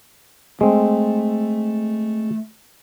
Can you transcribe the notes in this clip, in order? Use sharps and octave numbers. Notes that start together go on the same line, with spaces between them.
G#3 A3 C4